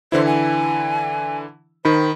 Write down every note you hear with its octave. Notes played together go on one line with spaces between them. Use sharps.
D3 E3 E4 C5
G#5
D#3 C5 B5